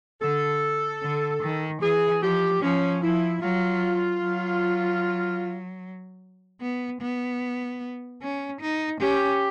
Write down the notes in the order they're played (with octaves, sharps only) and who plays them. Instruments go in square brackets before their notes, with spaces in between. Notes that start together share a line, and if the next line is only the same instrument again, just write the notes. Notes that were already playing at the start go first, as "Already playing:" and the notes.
[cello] D3 [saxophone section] A4
[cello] D3
D#3
[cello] E3 [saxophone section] G#4
[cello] F3 [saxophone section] G4
[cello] F3 [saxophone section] C#4
[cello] F3 [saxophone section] E4
[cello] F#3 [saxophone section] F4
[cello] F#3
B3
B3
C#4
D#4
[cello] C#4 [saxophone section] G4